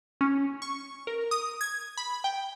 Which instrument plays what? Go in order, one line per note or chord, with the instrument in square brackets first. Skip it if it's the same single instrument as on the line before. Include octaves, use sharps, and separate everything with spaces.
[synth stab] C#4
C#6
A#4
D#6
G#6
B5
G5